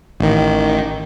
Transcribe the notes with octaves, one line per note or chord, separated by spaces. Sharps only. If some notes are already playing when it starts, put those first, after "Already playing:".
A1 D#3